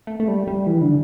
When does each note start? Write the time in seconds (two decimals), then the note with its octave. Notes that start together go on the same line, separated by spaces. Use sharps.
0.07 A3
0.20 A3
0.28 G3
0.47 G3
0.67 E3
0.82 D3